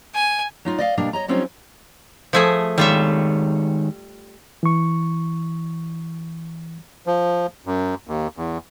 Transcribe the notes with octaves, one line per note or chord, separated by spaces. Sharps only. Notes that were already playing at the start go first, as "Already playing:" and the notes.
G#5
F#3 D#4 F4
D5 D#5 F5
B2 G3 A#3 D4
C#5 D#5 A#5
F#3 G3 C4 C#4 D#4 F4
F3 A3 G#4
D#3 G3 G#3 F4 C#5 E5
E3 C#6
F3
F#2
D#2
E2